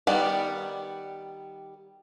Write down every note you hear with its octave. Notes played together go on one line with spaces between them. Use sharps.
D#3 G3 B3 D5